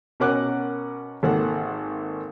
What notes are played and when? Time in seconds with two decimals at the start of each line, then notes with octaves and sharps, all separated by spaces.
0.20 B2 C#4 A#4 F#5 D6 F#6
1.23 G#1 A#3 A4 F#5